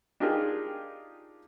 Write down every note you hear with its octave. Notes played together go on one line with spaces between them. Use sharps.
D4 D#4 F4 G4 G#4 A#4